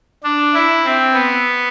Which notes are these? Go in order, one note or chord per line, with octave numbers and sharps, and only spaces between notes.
D4
E4
C4
B3